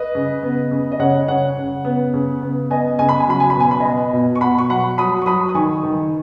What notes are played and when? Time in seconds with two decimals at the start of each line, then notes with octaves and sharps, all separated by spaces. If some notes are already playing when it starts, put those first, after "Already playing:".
Already playing: B4 D#5
0.15 C#3
0.43 B3
0.71 C#3
0.92 D#5
0.99 C#3 C#5 F#5
1.28 C#3 C#5 F#5
1.57 C#3
1.85 B3
2.14 C#3
2.42 B3
2.70 B3 D#5 G#5
2.99 C#3 G#5
3.09 B5
3.20 G#5
3.27 F#3 B5
3.40 G#5
3.50 B5
3.56 B2 G#5
3.71 B5
3.80 B3 D#5 G#5
4.13 B2
4.35 C#6
4.41 B2 F#5 B5
4.58 C#6
4.70 F#3 F#5 B5
4.98 F#3 B5 D#6
5.22 C#6
5.26 F#3 B5 D#6
5.49 D#6
5.55 D#3 G#5 C#6
5.83 D#3